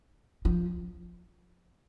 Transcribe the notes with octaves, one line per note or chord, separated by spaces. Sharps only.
F3